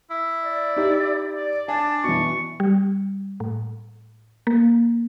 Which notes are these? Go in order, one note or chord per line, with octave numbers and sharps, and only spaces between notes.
E4
D5
D#4 G4 D#5
D5
D4 G#5 A5
B2 E3 C#6
G3
A2
A#3